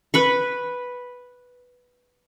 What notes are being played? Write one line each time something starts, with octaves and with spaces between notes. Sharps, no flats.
B4 B5 C#6